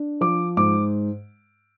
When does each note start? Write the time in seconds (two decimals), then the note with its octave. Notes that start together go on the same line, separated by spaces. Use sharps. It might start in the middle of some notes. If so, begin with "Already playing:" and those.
Already playing: D4
0.21 F3 D6
0.57 G#2 D6